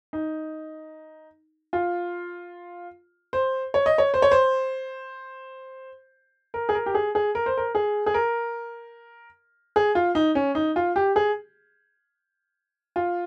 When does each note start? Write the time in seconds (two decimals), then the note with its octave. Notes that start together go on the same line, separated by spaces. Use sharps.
0.13 D#4
1.73 F4
3.33 C5
3.74 C#5
3.86 D#5
3.98 C#5
4.14 C5
4.22 C#5
4.31 C5
6.54 A#4
6.69 G#4
6.75 A#4
6.86 G4
6.95 G#4
7.15 G#4
7.35 A#4
7.46 C5
7.57 A#4
7.75 G#4
8.06 G#4
8.14 A#4
9.76 G#4
9.95 F4
10.15 D#4
10.35 C#4
10.55 D#4
10.76 F4
10.96 G4
11.16 G#4
12.96 F4